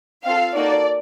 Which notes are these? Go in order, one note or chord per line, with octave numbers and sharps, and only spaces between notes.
C4 F4 A4 F5
A#3 D#4 F#4 A4 D5